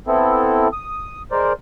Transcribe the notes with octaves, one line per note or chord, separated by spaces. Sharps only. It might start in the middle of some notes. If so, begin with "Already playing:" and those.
B3 C4 E4 A4
D#6
G#3 A#4 C5 D5